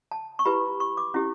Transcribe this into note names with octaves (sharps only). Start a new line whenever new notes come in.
A5
C#6
E4 G4 B4 B5
C#6
D6
C#4 E4 G4